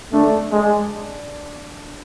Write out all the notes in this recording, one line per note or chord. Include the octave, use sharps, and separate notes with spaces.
A3 D4
G#3